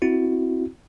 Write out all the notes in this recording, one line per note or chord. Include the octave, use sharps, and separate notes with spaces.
C4 E4 F#4